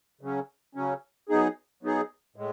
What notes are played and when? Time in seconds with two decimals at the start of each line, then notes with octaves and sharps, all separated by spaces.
0.21 C#3 F#3 C#4
0.75 C#3 F#3 C#4
1.29 F#3 B3 D#4 G#4
1.83 F#3 B3 D#4 G#4
2.36 A2 G#3